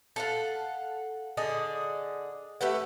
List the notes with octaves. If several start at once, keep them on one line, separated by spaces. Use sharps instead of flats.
A4 F5 F#5
D3 G#4 D5 D#5
A3 G4 B4 F#5